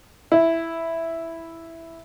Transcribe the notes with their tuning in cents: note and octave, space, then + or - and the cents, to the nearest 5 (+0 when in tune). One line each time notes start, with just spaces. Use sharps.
E4 +0